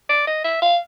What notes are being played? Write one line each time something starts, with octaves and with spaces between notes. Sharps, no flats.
D5
D#5
E5
F5